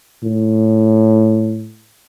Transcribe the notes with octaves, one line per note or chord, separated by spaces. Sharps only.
A2